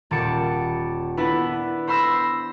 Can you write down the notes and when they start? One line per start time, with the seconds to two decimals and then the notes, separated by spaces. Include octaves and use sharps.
0.11 D#1 A5 D6 C#7
1.17 B3 D4 E4 B4
1.87 C5 B5 C6 E6 A#6